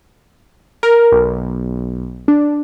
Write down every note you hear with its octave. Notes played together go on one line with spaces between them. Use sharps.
A#4
B1
D4